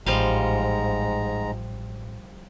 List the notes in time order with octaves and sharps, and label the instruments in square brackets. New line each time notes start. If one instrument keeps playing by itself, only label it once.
[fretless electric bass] A1 [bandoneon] G#2 G#3 A#5 [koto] F3 G3 F5